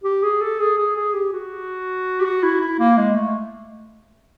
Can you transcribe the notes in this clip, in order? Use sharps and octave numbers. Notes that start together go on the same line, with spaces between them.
G4
G#4
A4
G#4
G#4
G#4
G4
F#4
G4
F#4
E4
E4
A#3
G#3
A3